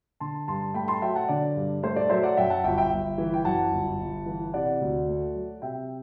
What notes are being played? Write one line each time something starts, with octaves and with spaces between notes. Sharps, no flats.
D3 A5 C6
G2 A5 C6
A3 G5 B5
A5 C6
F#3 E5 G5
F#5 A5
D3 D5
G2
A3 C5
D5
F#3 C5 E5
D5 F#5
F#2 E5 G5
F#5 A5
G1 E5 G5
E5 G5
G1
E3
G5
F#2 F#5 A5
G1
G1
E3
C3 D5 F#5
D2
A3
F#3
C3 E5 G5